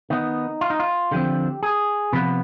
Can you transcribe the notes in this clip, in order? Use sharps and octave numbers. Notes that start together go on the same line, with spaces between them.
D#3 B3 D#4
F4
D#4
F4
D3 F3 C4 G4
G#4
C3 F3 B3 B4